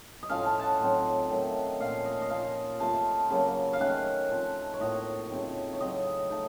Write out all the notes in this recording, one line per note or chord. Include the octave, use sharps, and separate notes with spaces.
D#5
A2 F3 A3 C#4 F5
A5
F#5 A5
A2 F#3 C4 D#4
D#3 F#3 A3
A#2 F3 A3 C#4 F5
D#5
D#5
A#2 F3 A#3 F5
C3 F3 A3 A5
C#3 F#3 A#3
F5
D#3 A3 C#4 F#5
F3 C4 D#4
C#5
A2 F3 A#3 D#5
C#3 A3 C4 D#4
C#5
C#3 F#3 C4 D#5
A3 D#4